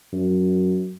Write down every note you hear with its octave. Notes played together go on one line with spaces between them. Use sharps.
F#2